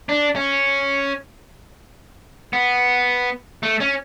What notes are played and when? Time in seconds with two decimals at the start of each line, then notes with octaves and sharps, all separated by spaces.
0.09 D4
0.36 C#4
2.53 B3
3.63 A3
3.80 C#4